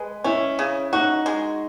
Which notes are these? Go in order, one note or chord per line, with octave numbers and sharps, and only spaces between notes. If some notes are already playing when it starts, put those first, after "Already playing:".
Already playing: G#3 B4
C#4 E4
C#3
D#4 F#4
G#3